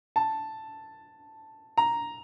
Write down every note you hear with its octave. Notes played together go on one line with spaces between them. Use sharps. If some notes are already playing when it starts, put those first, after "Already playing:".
A5
A#5